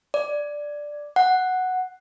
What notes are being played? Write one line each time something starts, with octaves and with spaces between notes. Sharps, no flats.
D5
F#5